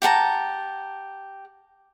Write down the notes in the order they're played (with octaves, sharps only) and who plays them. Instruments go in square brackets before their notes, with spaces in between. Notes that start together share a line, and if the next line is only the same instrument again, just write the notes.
[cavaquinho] G4 F#5 A5 A#5